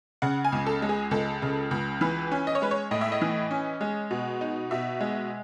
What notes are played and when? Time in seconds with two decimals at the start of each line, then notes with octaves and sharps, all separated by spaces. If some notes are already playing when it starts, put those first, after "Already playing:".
0.22 C#3 F#5
0.45 G#5
0.52 C#2
0.66 A4
0.82 G#3
0.89 G#4
1.11 C#2 A4
1.42 C#3
1.71 C#2
2.01 E3 B4
2.32 C#4
2.47 D#5
2.55 C#5
2.62 G#3 B4
2.71 C#5
2.91 A2 D#5
3.01 E5
3.12 D#5
3.21 E3
3.51 C#4
3.81 G#3
4.11 B2
4.41 D#4
4.71 B2 E5
5.01 G#3